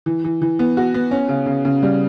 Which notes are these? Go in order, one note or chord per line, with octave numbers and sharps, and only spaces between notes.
E3
E3
E3
B3
F#4
B3
C#4
C#3
C#3
C#3
G3